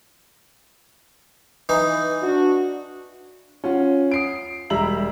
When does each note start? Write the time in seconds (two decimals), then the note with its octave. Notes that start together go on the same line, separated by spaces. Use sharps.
1.69 E3 D#4
2.22 D4 F#4
3.64 C#4 F4 F#5
4.12 D#6 C7 D7
4.70 E1 G3 E5 A#5 E6 F#7